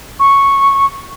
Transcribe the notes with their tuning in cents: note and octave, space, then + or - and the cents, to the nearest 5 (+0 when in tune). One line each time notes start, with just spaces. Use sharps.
C#6 -5